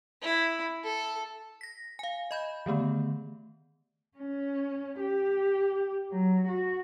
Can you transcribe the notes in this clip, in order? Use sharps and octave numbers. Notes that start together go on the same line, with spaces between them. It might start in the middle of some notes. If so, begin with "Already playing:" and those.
E4
A4
A#6 B6
F5 G#5
D#5 B5 G6
D3 D#3 A3 B3
C#4
G4
F#3
F#4